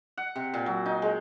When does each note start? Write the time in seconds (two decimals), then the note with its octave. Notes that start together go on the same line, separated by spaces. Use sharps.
0.17 F#5
0.36 C3
0.54 A#2
0.66 F#3
0.86 D#4
1.02 G#3